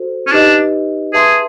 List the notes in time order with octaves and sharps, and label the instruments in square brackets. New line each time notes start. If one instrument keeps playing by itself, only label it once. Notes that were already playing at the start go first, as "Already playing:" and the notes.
Already playing: [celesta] F#4 A4 C5
[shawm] C#4
[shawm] D4 [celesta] D#4 G4 B4 D#5
[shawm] G#4 [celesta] B4 E5 A5 C6